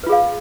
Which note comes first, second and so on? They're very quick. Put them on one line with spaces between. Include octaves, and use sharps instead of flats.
B4 F4 G#4 F5